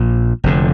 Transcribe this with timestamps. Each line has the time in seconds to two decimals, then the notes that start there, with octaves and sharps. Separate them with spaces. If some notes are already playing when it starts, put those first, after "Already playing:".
Already playing: A#1 A#2
0.44 F1 F2 D3